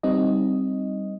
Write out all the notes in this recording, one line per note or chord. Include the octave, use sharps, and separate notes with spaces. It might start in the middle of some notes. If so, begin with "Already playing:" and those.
G3 C4 D#4 D#5